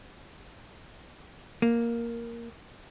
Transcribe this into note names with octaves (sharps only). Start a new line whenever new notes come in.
A#3